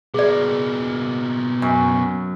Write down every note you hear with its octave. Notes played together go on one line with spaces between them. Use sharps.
B2 A#3 G#4 D5
F#2